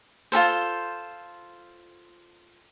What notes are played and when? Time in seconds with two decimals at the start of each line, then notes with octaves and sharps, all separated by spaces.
0.32 F4 F#4 A4 C5